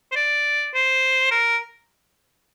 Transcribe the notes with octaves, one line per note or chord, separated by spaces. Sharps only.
C5
D5
C5
A#4